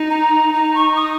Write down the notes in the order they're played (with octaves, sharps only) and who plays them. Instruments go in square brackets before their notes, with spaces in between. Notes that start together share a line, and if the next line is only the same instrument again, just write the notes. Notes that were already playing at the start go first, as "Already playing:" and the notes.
Already playing: [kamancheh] D#4
[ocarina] A#5
[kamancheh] D#4 [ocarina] A#5
[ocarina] C#6
D#6